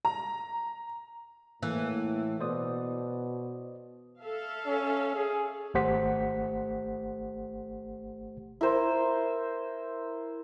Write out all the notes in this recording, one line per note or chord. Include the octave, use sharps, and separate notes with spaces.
A#5
A2 E3 A#3
B2 C5 D5 D#6
A4 E5 F5
C#4
G#4
G#1 A3 G4 C5 F#5 B6
E4 A#4 C5